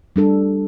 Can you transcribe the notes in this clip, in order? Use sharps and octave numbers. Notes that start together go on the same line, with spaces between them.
G3 D4 A4